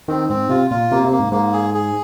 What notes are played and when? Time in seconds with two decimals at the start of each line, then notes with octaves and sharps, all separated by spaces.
0.08 D#3 C4
0.30 G#2 C4
0.49 C3 F4
0.70 A#2 F4
0.91 C3 A#3
1.05 C3
1.13 A#3
1.19 G#2
1.32 G#2 A#3
1.53 G#4
1.74 G#4